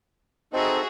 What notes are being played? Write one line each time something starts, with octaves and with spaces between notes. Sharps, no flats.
C4 D#4 F#4 G#4 A4 D#5 E5